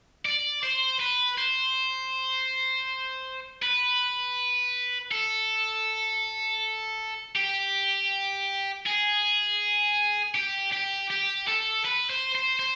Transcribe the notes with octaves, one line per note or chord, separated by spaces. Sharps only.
D5
C5
B4
C5
B4
A4
G4
G#4
G4
G4
G4
A4
B4
C5
C5
C5